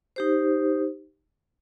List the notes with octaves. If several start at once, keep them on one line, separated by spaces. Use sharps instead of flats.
D#4 G4 C5